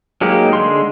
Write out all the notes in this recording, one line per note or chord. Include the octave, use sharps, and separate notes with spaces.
F#3 G#3 A#3 D#4 G4
D3 G#3 C6